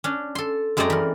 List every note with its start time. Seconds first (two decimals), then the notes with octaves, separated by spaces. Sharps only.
0.04 C#4 D4
0.35 A4 C6
0.77 F#2 G#3 A3 C4 D5 A#5
0.90 E3 A#4